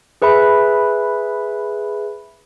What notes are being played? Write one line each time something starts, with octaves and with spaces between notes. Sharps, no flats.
G#4 B4 E5 B5